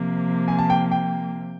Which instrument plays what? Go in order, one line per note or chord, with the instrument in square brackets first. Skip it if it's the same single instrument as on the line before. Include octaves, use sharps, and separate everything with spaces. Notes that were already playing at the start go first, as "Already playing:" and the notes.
Already playing: [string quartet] C3 F3 A#3
[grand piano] G#5
A5
G5
G5